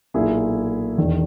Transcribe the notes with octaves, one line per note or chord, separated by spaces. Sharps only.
B1 A#2 A#3 E4 G#4
E1 E2 D#3